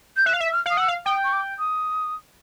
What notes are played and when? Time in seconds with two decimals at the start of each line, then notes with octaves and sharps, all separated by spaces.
0.17 G6
0.26 E5 F#6
0.33 F5
0.40 E5
0.52 F6
0.66 F5 D#6
0.77 F#5 E6
0.88 F5
1.06 G5 D#6
1.24 C#6
1.33 D6
1.59 D#6